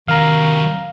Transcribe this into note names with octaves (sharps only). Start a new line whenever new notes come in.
C3 D#3 F#3 F5 A#5